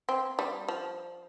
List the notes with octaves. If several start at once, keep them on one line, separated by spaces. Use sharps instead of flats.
C4
G3
F3